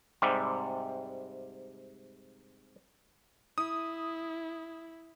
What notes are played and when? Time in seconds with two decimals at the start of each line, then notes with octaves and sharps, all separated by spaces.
0.22 G#2 C3 G3
3.58 E4 D#6